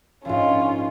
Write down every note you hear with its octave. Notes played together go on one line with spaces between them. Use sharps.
A#1 G#2 C#4 F4